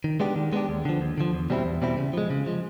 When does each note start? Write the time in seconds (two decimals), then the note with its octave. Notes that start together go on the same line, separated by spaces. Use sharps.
0.04 D#3
0.20 G#3 B3 D4 G4
0.36 D#3
0.53 G#3 B3 D4 G4
0.69 D#2
0.85 D3 F3
1.01 D#2
1.18 D3 F3
1.33 E2
1.50 B2 G3 C4 E4
1.65 E2
1.82 B2 G3 C4 E4
1.97 C#3
2.13 F3 G#3
2.30 C#3
2.46 F3 G#3